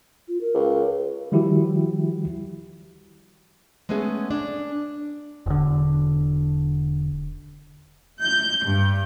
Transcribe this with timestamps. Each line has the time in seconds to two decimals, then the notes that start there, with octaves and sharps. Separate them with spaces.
0.28 F4
0.41 A#4
0.54 C#2
1.32 D#3 F3 G3 E4 F#4 G4
3.89 G#3 A3 B3 C#4 G#4
4.31 D4
5.46 E1 D3
8.20 G6
8.63 G2